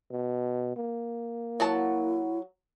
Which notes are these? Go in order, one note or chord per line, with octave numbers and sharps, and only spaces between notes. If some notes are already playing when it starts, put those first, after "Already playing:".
B2
A#3
F#3 E4 F#4 A5